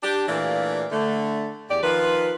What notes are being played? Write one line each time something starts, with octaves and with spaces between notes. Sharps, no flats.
D4 G4
A#2 E3 A3 D4 D5 F5
D3 A3
E2 G4 D5
D#3 F3 F4 B4